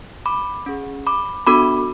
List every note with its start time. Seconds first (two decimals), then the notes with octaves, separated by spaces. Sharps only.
0.26 B5 D6
0.66 C#4 G#4
1.07 B5 D6
1.47 B3 D4 F#4 A4 B5 D6